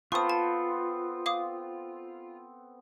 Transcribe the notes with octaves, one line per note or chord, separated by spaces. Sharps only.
B3 C4 F4 A4 C#6 D#6
A5
F5 D6 D#6